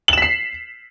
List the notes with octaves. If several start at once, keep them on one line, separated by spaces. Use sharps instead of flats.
B6 C7 E7 F#7